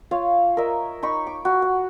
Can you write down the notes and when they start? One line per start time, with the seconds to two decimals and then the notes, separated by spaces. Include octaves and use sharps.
0.11 F4 C#5 F5
0.57 A#4 D#5 E5
1.03 D#4 B5 C#6
1.27 D6
1.45 F#4
1.62 F#5